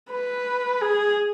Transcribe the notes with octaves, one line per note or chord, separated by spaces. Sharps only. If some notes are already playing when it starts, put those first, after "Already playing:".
B4
G#4